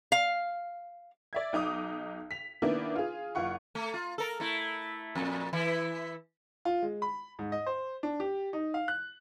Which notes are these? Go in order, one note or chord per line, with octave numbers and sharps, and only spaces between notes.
F5
D5 E5 G#6
B1 D#4 D6 D#6
B6 F7
D#3 A#3 B3 D4 E4
F4 G#4
F#1 F4 F#5 C#6
A3
F4
A4 A#4
A3 E4
F2 A#2
E3 E4
F4
G#3
B5
G#2
D#5
C5
D4
G4
D#4
F5
F#6